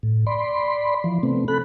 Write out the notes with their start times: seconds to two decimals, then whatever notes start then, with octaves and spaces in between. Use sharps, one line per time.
0.03 A2
0.26 D5 B5 C6
1.04 E3 F3
1.23 C3 A3 B3 C4
1.48 A4 B5 F#6